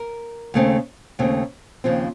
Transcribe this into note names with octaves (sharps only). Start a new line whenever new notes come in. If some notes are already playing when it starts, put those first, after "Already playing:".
Already playing: A#4
D#2 C#3 A3 C4
D#2 C#3 A3 C4
D#2 C#3 F3 C4